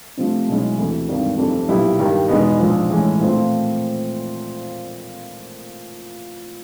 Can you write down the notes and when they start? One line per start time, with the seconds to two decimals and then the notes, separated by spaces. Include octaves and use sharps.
0.17 C3 F3 A3
0.48 B1 B2 G#3 C#4 E4
0.77 D2 C3 E3
1.08 G#1 G2 D#3
1.38 F1 F2 C3
1.69 B1 A#2 G3 B3 E4
1.99 G2 D#3 G3
2.28 E2 B2 G#3 B3 D#4
2.58 A#1 G#2 F3
2.89 A2 E3 G#3 C#4
3.20 A#2 F3 A3 C4 F4